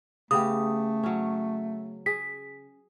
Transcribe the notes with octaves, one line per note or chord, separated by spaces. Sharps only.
C#3 A3 B3 G4 D#6
F#3 C#4
G#4 B6